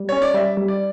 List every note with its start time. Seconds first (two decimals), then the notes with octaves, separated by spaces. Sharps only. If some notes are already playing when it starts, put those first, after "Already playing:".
Already playing: G3
0.09 C#4 C#5
0.22 D5
0.34 G3 E5
0.57 G3
0.68 D5